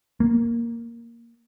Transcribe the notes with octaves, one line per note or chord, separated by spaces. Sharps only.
A#3